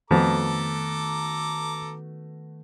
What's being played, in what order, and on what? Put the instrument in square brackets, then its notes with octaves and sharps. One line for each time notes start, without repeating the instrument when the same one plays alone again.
[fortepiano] F2 [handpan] D#3 [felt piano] A3 B3 F#4 [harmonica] A4 A#5 D6